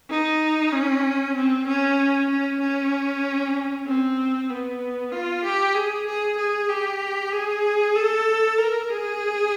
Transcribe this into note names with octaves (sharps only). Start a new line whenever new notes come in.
D#4
C#4
C4
C#4
C#4
C#4
C4
B3
F4
G4
G#4
G#4
G#4
G4
G#4
A4
A#4
G#4